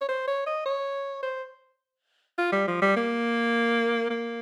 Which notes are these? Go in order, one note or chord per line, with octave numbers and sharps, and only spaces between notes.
C#5
C5
C#5
D#5
C#5
C5
F4
G3
F3
G3
A#3
A#3